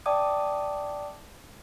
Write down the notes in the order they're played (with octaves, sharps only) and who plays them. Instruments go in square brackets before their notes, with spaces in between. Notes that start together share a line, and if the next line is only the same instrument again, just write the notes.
[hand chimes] D5 E5 G5 A5 D6 D#6